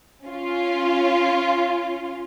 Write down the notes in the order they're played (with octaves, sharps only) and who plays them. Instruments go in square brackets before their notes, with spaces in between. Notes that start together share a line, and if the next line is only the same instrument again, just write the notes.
[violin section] C#4 F4